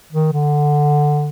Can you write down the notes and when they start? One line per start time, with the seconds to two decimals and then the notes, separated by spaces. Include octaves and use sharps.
0.12 D#3
0.32 D3